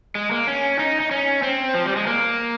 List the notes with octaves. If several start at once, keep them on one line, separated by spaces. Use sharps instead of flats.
G#3
A#3
C#4
D#4
D#4
C#4
C4
F3
G3
G#3
A#3